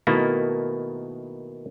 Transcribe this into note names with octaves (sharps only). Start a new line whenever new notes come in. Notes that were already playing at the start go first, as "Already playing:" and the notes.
B2 D#3 A3 A#3 E4